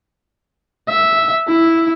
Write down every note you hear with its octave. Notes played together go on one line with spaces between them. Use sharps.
E5
E4